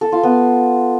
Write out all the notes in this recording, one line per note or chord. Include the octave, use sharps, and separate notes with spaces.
A4
F4
B3